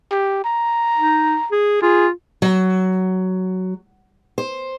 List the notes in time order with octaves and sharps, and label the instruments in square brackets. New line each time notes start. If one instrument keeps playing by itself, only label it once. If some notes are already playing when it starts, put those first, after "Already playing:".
[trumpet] G4
A#5
[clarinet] D#4
G#4
[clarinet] F4 [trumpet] G#4
[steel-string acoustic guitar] F#3
C5